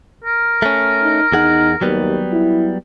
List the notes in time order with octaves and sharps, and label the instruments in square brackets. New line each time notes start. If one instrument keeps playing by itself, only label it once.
[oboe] A#4
[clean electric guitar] A3 C#4
[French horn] D#4
[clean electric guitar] E2 G#4 F#5 [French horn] D#4
[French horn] D#2 [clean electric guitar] F#3 G3 B3
[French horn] E4